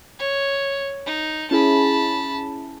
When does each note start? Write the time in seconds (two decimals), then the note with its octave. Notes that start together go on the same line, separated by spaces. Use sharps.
0.19 C#5
1.06 D#4
1.51 C#4 E4 G#4 A5 B5